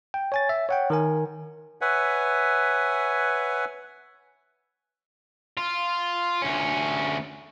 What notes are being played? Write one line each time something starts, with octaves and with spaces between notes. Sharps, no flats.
G5
C#5 G#5 A6
E5
C#5 F#5 G5
D#3 A#4 G#5
B4 C#5 E5 F#5 G#5
F4
D2 C#4